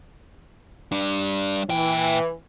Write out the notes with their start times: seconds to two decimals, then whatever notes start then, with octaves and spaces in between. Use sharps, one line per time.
0.92 G3 D4
1.69 A#2 E3 G5